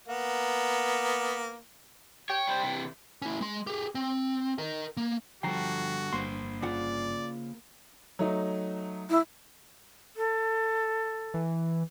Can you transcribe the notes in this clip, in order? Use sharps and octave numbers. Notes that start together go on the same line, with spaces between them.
A#3 B3
C#5 G5
G3 C5
C3 E3
C#4 E4
G#3 C6
G4 G#4
C4
A#4 D#5
A#3
D3 F3 G3 F#4 A4 G5 A#5 C7
G1 G2 A#3 C5 C6 C7
C#3 F4 D5 F#5
F#3 A3 D#4
E4
A4
E3